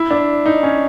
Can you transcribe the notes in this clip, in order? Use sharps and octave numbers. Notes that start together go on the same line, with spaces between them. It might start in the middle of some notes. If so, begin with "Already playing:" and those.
Already playing: E4
D4
D#4
C#4